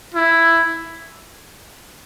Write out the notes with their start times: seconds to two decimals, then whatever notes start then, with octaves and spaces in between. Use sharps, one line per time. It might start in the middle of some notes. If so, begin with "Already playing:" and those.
0.14 E4